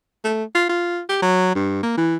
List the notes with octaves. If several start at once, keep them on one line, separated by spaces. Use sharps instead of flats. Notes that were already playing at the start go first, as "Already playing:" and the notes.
A3
F4
F4
G4
F#3
G2
A#3
E3